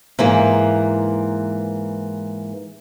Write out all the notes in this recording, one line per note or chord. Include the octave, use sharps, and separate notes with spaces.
G#2 E3 A#3